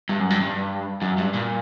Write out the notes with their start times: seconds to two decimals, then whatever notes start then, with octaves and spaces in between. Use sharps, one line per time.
0.09 G2
0.20 F#2
0.30 G2
0.41 G2
1.02 F#2
1.18 G2
1.34 A#2